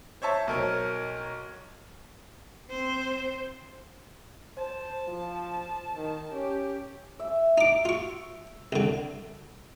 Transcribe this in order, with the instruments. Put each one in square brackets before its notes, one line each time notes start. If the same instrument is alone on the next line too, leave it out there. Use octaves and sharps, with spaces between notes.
[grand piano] C5 C#5 E5 A5
B1 A#4 C#5
[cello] C4 C5
[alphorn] C5 [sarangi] A5
[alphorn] F3
D#3
[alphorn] C#4 [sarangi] G4
[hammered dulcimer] E5
[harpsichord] D#4 D6
F4 C#6
C2 D3